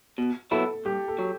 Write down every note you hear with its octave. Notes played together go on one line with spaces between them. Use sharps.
B2
F#3 B3 E4 A4
G2 G4
A4
F#3